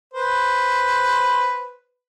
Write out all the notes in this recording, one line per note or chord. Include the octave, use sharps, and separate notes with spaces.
B4 C5